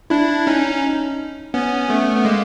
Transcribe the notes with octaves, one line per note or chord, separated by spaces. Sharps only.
D4 E4
C#4 D#4
B3 C#4
A3 B3
B3
G#3 A#3